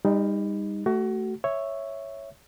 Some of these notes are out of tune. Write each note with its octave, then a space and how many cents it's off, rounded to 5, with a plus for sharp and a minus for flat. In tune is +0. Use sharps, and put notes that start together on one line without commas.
G3 +35 D#4 +0
A3 +0 F#4 +30
C#5 +0 E5 +0